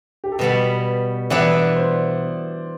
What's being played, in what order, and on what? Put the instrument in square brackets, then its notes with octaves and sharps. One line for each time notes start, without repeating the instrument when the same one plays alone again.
[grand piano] G4
A4
[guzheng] B2 G3 B3 [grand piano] B4
[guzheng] E3 B3 D4 [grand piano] D5
[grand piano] C5